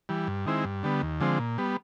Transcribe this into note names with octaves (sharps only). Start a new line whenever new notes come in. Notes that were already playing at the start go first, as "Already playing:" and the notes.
E3 G3
G2
D#3 G#3 C4 E4
G2
D3 G3 B3
D#2
D3 F3 G#3 C4
A#2
G3 B3